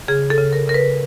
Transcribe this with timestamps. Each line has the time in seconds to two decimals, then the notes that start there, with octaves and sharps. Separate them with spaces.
0.08 C#3 G#4
0.30 A4
0.38 C#3
0.53 A#4
0.68 C#3 A#4
0.74 B4